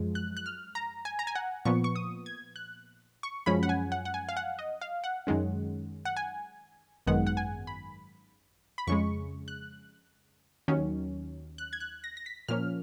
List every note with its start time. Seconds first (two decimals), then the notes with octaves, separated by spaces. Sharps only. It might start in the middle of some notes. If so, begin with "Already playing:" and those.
Already playing: F#2 F3 G#3
0.15 F#6
0.37 F#6
0.46 F6
0.75 A#5
1.05 G#5
1.19 A#5
1.27 G#5
1.35 F#5
1.65 A#2 F3 B3 C#6
1.84 C#6
1.96 D#6
2.26 G#6
2.56 F#6
3.23 C#6
3.46 F#2 F3 G#3 C#4 B5
3.63 F#5
3.69 G#5
3.92 F#5
4.05 F#5
4.14 G#5
4.29 F5
4.37 F#5
4.59 D#5
4.81 F5
5.04 F#5
5.27 F#2 D#3 G#3 C#4
6.05 F#5
6.17 G#5
7.07 G#1 F#2 D#3 G#3 B3 F#5
7.27 F#5
7.37 G#5
7.67 B5
8.78 B5
8.87 F2 C#3 G#3 C#6
9.48 F#6
10.68 D#2 D#3 F#3 C#4
11.58 F#6
11.73 G#6
11.80 F#6
12.04 A#6
12.17 A#6
12.26 B6
12.48 A#2 F3 A#3 C#4 F6